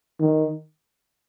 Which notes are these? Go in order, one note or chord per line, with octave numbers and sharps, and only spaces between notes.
D#3